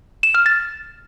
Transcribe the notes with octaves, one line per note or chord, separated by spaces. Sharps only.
E7
F6
A6